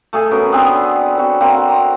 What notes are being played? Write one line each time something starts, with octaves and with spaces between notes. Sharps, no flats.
A3 G#4 G#5
B3 C#4 F#4 A#4
B3 C4 D4 G#4
C4 F#4
A#3 C4 F#4
A#5